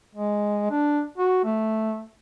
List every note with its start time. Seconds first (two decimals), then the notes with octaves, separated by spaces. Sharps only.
0.15 G#3
0.71 D4
1.18 F#4
1.44 A3